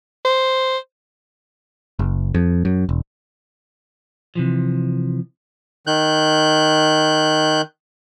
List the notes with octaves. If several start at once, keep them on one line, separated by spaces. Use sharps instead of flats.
C5
F#1
F2
F#2
E1
C3 E3 F3
D#3 F#6 G6